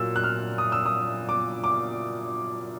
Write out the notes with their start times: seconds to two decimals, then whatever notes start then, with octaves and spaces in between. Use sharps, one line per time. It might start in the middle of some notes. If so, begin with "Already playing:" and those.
Already playing: A#2 F#3 E6
0.16 F#6
0.24 F6
0.58 D#6
0.72 E6
0.86 D#6
1.29 D6
1.64 D6